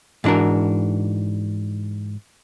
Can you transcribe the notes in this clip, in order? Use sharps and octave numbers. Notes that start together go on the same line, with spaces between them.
G#2 E3 D4 F#4 A#4